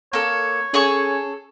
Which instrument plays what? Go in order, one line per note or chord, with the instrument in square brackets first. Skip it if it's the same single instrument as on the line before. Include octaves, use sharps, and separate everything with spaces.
[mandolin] A#3 A4 [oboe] C#5
[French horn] C#4 [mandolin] G#4 A4 C#6